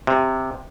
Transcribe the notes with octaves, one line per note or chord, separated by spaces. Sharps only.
C3